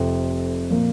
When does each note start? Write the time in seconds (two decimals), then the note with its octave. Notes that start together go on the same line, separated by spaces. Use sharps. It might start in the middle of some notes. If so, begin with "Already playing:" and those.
Already playing: F1 F2 C3
0.70 A#2 F3 A#3